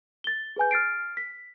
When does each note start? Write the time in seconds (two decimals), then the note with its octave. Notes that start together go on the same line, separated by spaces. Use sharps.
0.24 A6 G7
0.56 G#4 B4 G#5 G6
0.71 F6 A6 C7 D7
1.17 B6